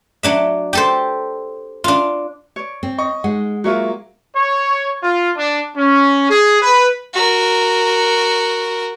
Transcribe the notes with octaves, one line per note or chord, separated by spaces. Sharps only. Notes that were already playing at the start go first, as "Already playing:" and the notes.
F#3 D4 E5
G4 A4 C5
D4 F4
C#5 D5
C4
D#5 C#6
G#3 D#4 F#5
F#3 A#3 F4 F#4 C#5 E5
C#5
F4
D4
C#4
G#4
B4
F#4 A#4